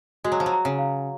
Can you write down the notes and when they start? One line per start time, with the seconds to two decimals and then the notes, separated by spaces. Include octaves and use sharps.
0.24 G#3 F#4
0.32 F#3
0.40 F3
0.46 F#3
0.52 A#5
0.65 C#3
0.79 F5